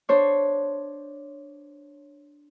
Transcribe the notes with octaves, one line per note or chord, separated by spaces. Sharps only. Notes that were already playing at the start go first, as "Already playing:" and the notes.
D4 C5 C#5